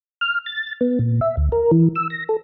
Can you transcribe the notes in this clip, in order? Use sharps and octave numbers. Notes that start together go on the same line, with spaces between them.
F6
A6
B3
A#2
E5
D2
A#4
E3
E6
A#6
A4